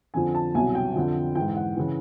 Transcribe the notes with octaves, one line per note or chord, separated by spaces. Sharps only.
F2 D3 F3 G#5
A5
C2 B2 F#3 G#5
G5
F2 D3 F3
E3 G5
G#2
F#5
C#3 E3